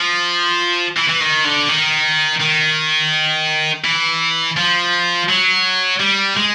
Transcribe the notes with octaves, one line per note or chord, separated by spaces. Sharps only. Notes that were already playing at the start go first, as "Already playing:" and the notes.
Already playing: F3
E3
E3
D#3
D3
D#3
D#3
E3
F3
F#3
G3
G#3